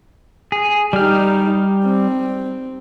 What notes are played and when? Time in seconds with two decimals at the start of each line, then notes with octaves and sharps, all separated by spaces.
0.52 G#4
0.93 G3 D#4 G4 F6
1.84 C4